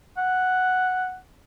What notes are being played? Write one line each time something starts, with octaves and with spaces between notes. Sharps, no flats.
F#5